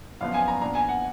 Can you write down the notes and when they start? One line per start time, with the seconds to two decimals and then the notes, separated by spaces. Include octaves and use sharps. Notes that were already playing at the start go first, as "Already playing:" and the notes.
0.21 F#2 F3 B3 F5
0.34 G#5
0.48 A#5
0.61 A#2 F3 B3 D4 A#5
0.75 G#5
0.89 F#5